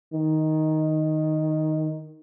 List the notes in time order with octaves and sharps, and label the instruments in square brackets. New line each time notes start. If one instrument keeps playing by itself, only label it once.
[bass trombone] D#3